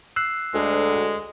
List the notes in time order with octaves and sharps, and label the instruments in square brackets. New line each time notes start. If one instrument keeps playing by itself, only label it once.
[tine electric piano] E6 F#6 C7
[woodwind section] D2 [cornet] G#3